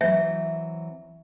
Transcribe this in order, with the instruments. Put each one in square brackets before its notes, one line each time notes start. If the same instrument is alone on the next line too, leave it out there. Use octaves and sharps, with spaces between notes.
[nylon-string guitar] E3 F#3 C4 [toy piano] E5